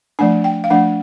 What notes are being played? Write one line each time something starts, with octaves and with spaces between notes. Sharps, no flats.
F3 A3 D4 G#5
G5
F5
F3 A3 D4 F#5